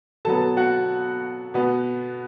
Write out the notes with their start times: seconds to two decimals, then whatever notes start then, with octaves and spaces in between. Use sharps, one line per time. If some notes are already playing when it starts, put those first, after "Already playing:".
0.25 B2 F#3 B3 A4 A5
0.57 F#4 F#5
1.54 B2 B3